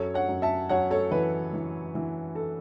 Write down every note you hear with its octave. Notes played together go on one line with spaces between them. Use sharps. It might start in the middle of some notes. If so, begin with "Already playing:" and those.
Already playing: F#2 A4 C#5
C#5 F#5
F#2
E5 A5
F#2 C#5 F#5
A4 C#5
E3 B4
E3
E3
A4